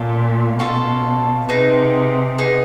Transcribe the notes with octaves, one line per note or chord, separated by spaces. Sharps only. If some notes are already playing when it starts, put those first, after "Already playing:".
Already playing: A#2 C#4 F4 A4
B2 C#4 F4 A4
C3 B3 D#4 G#4
B3 D#4 G#4